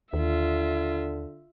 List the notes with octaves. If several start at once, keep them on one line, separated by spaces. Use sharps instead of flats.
D#2 D3 F4 E5